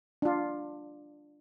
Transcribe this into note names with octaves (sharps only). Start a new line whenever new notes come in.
D4 F4